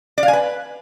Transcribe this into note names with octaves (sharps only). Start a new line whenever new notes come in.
D5
F5
G#5
B4